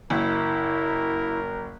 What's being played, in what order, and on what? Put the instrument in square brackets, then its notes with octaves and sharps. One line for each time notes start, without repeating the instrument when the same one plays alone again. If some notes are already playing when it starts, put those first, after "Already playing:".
[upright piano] F#1 [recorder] E4 [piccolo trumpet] A#4